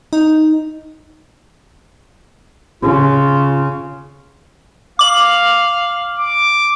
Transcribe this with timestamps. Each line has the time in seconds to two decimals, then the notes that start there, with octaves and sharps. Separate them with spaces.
0.13 D#4
2.83 C#3 F4
4.99 F5 D6 F#7
6.19 D6